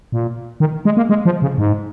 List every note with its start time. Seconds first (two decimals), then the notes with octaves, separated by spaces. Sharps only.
0.12 A#2
0.60 D#3
0.85 G#3
0.97 A#3
1.09 G#3
1.25 F3
1.42 C#3
1.58 G#2